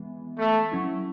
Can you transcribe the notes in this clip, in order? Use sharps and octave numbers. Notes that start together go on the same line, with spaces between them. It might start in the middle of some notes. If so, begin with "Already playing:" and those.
Already playing: E3 G#3 B3
A3
F#3 C#4 E4